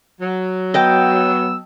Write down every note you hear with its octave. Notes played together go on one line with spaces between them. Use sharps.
F#3
B3 D#5 G5 A5 E6